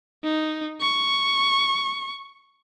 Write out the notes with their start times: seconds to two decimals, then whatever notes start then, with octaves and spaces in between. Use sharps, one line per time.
0.24 D#4
0.81 C#6